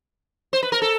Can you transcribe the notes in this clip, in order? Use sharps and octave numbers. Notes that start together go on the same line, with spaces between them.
C5
B4
A#4
A4